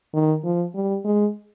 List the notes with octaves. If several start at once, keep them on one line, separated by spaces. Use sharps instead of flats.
D#3
F3
G3
G#3